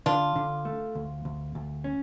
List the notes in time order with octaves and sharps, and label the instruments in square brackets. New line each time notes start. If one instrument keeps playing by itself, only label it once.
[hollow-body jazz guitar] D3 [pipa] D4 F4
[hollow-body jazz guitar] D3
A3
D2
D2
D2
C#4